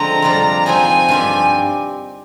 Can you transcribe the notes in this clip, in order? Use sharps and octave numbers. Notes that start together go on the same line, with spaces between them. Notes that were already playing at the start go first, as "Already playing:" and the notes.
Already playing: D3 F3 G#3 C4 A#5
F2 C3 G3 D4 F4
F3 C4 D#4 G#4 G#5
G2 F3 C4 G4